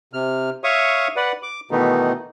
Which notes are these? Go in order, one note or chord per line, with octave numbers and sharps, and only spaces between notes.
C3 F6
C#5 E5 F5 C#6 D#6
B4 D5 F#5
D6
B2 D#3 E3 A3 B3 D#4